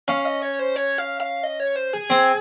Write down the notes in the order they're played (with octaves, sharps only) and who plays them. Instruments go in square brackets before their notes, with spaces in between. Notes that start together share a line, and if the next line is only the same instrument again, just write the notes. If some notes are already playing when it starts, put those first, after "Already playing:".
[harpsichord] C#4 [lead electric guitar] F5
[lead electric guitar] D#5
C#5
C5
C#5
F5
F5
D#5
C#5
C5
G#4
[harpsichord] C4